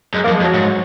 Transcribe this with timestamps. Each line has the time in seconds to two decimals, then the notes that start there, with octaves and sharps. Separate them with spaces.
0.14 F#2 G#3
0.24 A#3
0.27 F2
0.34 G#3
0.40 F2
0.44 F#3
0.54 G#2